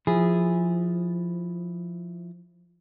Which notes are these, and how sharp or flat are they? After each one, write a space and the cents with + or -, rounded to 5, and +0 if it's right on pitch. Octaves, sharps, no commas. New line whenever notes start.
F3 +0 E4 +0 G#4 -10